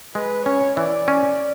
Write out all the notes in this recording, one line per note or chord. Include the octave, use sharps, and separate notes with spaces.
G#3 B4
C#4 C#5
E3 D5
C#4